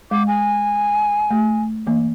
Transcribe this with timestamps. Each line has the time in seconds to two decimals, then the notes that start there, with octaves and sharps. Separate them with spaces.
0.11 G#3 D6
0.27 G#5
1.31 A3
1.87 E3 A#3